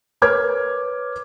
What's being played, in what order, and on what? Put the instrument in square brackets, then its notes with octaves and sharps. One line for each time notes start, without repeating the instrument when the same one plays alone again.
[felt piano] A#4 B4 C#5 D6 F6 G#6